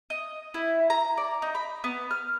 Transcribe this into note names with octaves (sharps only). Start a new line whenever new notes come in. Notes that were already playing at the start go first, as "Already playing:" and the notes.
D#5
E4
A#5
D5
D#4
B5
B3
F6